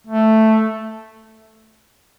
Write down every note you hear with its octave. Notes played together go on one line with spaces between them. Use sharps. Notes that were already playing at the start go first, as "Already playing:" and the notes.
A3